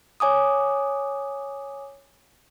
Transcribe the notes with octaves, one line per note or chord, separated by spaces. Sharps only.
C#5 G#5 D6 D#6